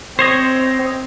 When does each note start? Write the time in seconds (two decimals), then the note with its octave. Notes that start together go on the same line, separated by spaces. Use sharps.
0.19 C4 C5 C#5 D#5